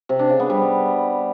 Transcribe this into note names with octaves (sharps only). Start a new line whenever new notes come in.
C3
D4
C#3
B3
G3